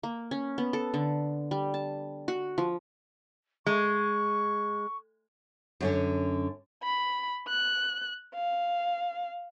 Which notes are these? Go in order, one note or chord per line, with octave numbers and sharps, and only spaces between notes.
A#3
C#4
B3
A4
D3
G3
A5
F#4
F3
G#3 C#6
F#2 D3 C#4
B5
F#6
F5